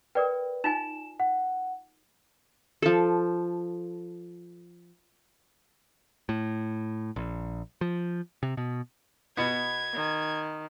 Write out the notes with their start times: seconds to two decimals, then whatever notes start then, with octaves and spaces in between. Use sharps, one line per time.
0.15 A#4 B4 D5 G5
0.64 D#4 F4 G#5 E7
1.20 F#5
2.82 F3 A4
6.29 A2
7.16 A#1
7.81 F3
8.43 C3
8.57 B2
9.37 B2 B3 G#6
9.94 D#3